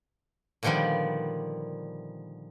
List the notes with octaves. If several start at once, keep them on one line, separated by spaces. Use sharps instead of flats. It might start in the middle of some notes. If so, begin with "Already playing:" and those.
A#2 D3 D#3 F3 G3 B3